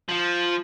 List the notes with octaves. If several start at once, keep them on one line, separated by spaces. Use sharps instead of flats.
F3